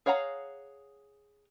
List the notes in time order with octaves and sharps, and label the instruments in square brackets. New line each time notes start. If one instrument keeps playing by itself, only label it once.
[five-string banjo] G#4 C#5 F5 F#5 A#5